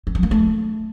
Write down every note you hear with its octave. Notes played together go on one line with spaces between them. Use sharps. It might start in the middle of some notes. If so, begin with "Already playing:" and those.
C4
F#3
A#3
A3